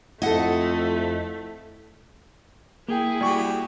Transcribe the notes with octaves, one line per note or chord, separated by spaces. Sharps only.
F2 A3 E4 A4 D#5 F#5
A#3 E4 G#4 G5
G3 F#4 G4 C#6